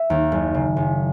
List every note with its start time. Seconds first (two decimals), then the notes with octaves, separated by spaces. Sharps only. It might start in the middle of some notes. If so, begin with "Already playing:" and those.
Already playing: E5
0.10 D#2
0.32 F#1
0.54 C#3
0.76 F#1